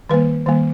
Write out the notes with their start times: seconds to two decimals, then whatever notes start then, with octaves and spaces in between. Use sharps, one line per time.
0.09 D#3 G3 A#3 B4
0.46 D#3 G3 A#3